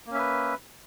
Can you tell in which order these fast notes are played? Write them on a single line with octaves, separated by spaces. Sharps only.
A#3 C#4 E5 B4